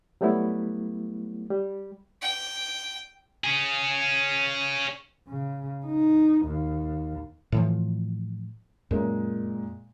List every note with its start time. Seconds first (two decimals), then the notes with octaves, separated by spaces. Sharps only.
0.21 F#3 G3 A3 B3 E4
1.50 G3
2.22 G5
3.44 C#4 G#4
5.28 C#3
5.86 D#4
6.46 D#2
7.52 A2 E3 F3
8.91 F#2 A#2 G#3 A#4